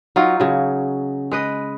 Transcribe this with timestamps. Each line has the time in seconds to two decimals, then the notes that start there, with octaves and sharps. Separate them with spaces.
0.16 F#3 D#4 F4
0.40 C#3 F#3
1.32 G#3 B4 D#5